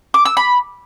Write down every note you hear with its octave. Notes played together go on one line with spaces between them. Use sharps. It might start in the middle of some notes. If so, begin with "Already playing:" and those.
D6
E6
B5